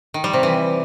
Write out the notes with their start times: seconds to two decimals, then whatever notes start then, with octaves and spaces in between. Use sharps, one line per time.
0.14 D#3
0.24 G3
0.33 C3
0.43 E3